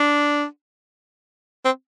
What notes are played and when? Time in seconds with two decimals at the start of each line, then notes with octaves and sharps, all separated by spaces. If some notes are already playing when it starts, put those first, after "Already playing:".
Already playing: D4
1.65 C4